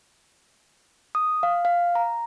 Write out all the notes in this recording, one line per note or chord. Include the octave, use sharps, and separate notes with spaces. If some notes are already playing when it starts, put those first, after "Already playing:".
D#6
F5
F5
A#5